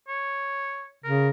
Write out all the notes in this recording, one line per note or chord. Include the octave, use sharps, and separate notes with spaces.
C#5
C#3 A#4